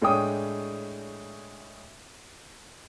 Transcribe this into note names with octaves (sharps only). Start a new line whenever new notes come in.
A2 G#3 D4 C#5 G5 D#6